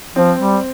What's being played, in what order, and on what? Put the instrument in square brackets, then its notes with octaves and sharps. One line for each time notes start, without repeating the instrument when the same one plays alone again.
[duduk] F3 [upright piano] C4
[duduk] G3